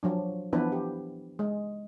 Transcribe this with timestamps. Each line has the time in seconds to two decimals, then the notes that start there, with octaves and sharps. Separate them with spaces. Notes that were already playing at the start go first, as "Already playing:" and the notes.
0.03 F3 F#3 D4
0.53 E3 F3 B3 D4 E4 B4
0.72 G4
1.39 G#3